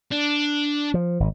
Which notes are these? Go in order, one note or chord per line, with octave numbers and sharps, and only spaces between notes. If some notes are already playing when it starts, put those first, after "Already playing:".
D4
F3
G#1